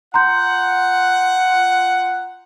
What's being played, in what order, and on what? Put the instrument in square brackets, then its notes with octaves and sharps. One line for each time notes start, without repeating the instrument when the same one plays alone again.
[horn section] F4 F#5 [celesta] A#5 C6 G6